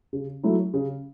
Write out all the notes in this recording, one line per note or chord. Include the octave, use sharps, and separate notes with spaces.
C#3
F#3 A3 E4
C#3